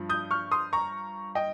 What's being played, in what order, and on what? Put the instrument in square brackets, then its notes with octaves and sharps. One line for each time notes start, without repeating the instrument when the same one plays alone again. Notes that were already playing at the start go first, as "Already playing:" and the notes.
Already playing: [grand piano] G2 F3
D#6 G6
C#6 F6
C6 D#6
A#5 C#6
D#5 G5